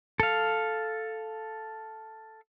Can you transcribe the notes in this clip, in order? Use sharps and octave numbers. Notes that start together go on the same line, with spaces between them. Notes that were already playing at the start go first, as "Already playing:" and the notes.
A4 F5